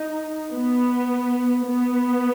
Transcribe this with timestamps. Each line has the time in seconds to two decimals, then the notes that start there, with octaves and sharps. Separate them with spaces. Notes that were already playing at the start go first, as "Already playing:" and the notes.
Already playing: D#4
0.52 B3
1.66 B3